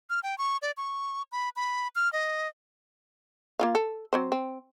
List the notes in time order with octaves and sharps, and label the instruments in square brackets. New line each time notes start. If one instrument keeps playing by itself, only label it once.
[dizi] F6
G5
C#6
D5
C#6
B5
B5
F6
D#5
[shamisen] A#3 F4 F5
A4
F#3 C4 C5
C4